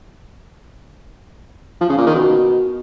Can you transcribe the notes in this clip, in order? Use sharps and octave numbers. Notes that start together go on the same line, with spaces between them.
F3
C#3
A#2
D#3
B2